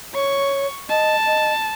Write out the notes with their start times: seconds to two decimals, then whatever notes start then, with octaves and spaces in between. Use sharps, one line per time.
0.14 C#5 C#6
0.89 D#5 A5
1.27 D#5